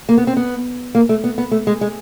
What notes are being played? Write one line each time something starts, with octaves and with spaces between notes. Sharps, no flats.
A#3
B3
C4
B3
A#3
A3
B3
B3
A3
G#3
G#3